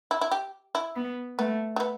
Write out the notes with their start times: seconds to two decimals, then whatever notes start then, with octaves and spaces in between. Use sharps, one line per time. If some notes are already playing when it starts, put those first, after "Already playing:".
0.11 E4
0.21 E4
0.31 G4
0.75 E4
0.96 B3
1.38 A3 B3
1.76 A3
1.80 B3